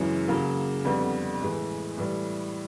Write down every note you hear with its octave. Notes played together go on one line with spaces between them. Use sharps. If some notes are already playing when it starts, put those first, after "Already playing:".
Already playing: F#2 C#3 E3 G#3 C#4
C#3 F#3 A#3
F2 D3 G3 B3
A2 E3 G#3
A2 E3 G3